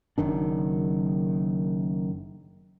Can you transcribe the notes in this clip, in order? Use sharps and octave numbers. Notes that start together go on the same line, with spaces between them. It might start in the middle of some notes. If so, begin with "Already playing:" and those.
F#1 F#2 D#3 D4